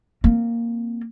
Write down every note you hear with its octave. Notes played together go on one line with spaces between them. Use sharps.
A#3 C4